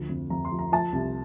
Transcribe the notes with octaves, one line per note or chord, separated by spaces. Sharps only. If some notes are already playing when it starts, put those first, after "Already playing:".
Already playing: D2 F3
F2
F2 A#5
C6
F3
A#5
F3 A5
C2